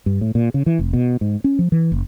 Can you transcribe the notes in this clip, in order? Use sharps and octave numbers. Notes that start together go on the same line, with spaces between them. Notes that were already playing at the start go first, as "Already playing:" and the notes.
G2
A2
A#2
C#3
E3
F1
B2
G#2
C#4
F3
E3
F#1